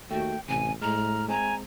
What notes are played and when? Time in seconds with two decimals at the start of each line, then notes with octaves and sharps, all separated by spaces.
0.11 D#2 A3 F#4 G5
0.49 A1 C3 G#5 D#7
0.81 A2 G#3 A#5 F6
1.29 G#3 C4 G#5 A#5